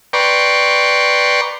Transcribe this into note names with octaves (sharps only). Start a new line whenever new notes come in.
B4 D5 G5 A#5 C6 C#6